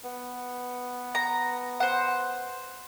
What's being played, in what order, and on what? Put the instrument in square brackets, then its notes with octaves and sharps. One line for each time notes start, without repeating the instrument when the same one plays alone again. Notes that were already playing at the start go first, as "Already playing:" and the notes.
[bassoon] B3
[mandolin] A#5
C5 F#5